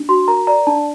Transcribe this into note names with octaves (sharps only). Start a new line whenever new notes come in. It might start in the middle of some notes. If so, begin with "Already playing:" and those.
Already playing: D4
F#4 C6
A#4 A#5
D5 A#5
D4 A5